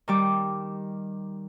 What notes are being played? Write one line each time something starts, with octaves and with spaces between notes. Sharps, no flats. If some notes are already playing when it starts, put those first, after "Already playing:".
D#3 G3 D6